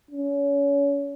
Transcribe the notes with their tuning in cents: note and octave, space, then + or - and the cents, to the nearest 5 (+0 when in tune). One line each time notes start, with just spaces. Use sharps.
C#4 +30